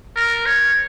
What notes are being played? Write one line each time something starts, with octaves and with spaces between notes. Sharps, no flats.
A#4
C#5